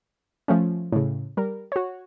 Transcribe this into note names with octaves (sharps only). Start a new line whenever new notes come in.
F3 A3 C#4
A2 C#3
G3 A#4
F#4 C#5